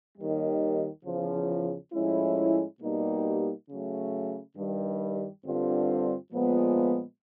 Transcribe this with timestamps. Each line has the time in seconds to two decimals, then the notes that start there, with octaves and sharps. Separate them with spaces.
0.16 D#2 D#3 G3
1.05 E2 C#3 F3
1.93 A2 F3 G#3 C#4 E4
2.80 B2 G3 A#3 D#4 G4
3.69 C#3 F#3 A3
4.56 G2 D#3 G3
5.44 G2 D3 G3 C4 F4
6.32 A#2 F3 G#3 B3